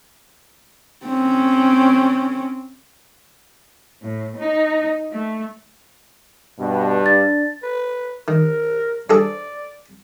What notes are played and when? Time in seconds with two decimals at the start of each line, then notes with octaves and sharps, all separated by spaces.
1.06 C4 C#4
4.02 A2
4.37 D#4
5.12 A3
6.59 G2 B2
7.06 D4 A6
7.63 B4
8.28 D#3 A#4
9.10 G2 G#4 A4 D5